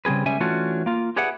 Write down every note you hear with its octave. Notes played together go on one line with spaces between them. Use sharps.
C#3 G3 C4 G#4 B4
C#2 G3 C#4 E5 G#5
E3 A3 C#4 D4 F4 F#4
A#3 F4
G4 G#4 B4 D5 E5 F#5